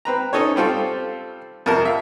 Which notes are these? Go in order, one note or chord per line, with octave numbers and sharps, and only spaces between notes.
C4 B4 A#5
C#4 D#4 A4 C#5
G3 C4 F4 A4
F2 C3 A#4 A5
E5 F5